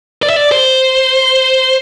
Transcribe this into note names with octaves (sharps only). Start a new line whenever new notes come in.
D5
E5
D5
C5